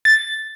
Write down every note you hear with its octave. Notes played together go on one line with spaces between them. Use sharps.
A6